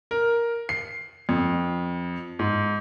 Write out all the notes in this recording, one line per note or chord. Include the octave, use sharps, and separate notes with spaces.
A#4
C7
F2
G#2